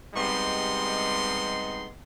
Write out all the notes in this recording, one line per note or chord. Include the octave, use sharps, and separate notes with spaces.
C3 G3 G#3 B3 D#4 C6